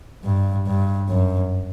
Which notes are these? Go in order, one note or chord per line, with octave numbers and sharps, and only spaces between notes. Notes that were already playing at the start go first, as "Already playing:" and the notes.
G2
G2
F#2